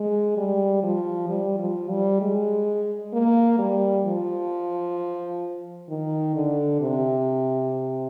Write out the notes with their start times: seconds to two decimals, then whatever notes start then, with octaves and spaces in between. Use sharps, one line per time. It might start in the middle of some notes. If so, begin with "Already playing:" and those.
Already playing: G#3
0.37 G3
0.83 F3
1.29 G3
1.59 F3
1.90 G3
2.21 G#3
3.13 A#3
3.58 G3
4.05 F3
5.89 D#3
6.35 D3
6.81 C3